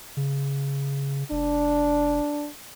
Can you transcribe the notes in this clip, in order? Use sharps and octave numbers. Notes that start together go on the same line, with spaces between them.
C#3
F1 D4